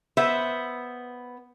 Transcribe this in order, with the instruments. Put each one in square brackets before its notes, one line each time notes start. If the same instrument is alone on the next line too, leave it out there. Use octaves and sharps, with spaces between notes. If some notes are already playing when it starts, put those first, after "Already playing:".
[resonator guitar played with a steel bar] B3 C5 E5